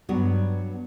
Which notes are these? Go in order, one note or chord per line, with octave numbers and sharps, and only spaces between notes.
G2 F#3 B3 F#4